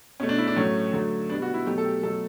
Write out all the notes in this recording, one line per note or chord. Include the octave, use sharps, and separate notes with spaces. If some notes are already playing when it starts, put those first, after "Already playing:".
B2 A3 C#4
D4
E4
D4
A2 F#3 A3 C#4
D3 F#3 A3
B2 G3 B3 D4
F#4
E4
B2 F#3 A3 G4
A4
G4
B2 F#3 A3 A4